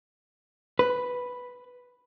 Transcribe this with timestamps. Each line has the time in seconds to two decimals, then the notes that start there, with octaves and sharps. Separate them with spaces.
0.79 B4